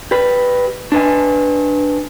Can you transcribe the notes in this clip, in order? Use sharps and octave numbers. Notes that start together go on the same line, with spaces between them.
G4 B4
D4 B4 G#5